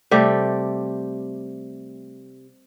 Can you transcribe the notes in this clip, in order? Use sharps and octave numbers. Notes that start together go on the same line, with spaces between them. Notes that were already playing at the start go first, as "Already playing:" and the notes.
C3 G3 A3 G4